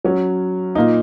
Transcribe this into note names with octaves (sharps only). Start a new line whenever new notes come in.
F#3 C#4
A#2 A#3 D#4